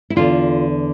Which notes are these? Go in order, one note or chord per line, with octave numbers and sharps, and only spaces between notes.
E4
E2 D3 F4